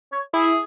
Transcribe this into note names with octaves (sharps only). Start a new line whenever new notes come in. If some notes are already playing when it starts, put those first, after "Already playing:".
C#5
E4 G#4